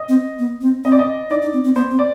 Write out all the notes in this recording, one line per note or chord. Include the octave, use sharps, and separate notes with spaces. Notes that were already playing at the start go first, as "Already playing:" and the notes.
Already playing: D#5
C4
B3
C4
C4 D#5
D5
D#5
D#4 D5
D#4
C4
C4
B3 C5
C4
D5